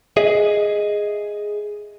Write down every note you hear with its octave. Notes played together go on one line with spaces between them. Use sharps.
G#4 D#5 E5